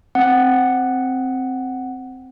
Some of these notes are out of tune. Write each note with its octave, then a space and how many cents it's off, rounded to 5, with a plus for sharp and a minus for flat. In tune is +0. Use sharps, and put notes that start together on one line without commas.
C4 +0 F#5 +0